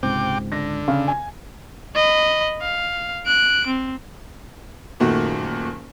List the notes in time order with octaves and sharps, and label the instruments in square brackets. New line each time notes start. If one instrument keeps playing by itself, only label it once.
[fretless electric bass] C#2 G#2 C4 [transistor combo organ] C3 G5 D6
[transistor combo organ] D3 [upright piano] A#6
[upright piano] C#3
G#5
[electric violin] D#5 B5
F5
F#6 D7
C4
[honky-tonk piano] F#1 A#2 D#3 A3 F#4